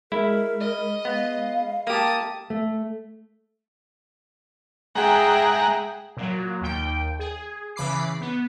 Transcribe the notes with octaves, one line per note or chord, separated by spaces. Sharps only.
G#3 E4 A#4 B5
D#5
B3 F5
A#3 G4 A5 D#6
A3
G#3 G#4 E5 F#5 G5 A#5
A#2 F#3
D#2 G5
G#4
C#3 E3 B5 D6 C7
B3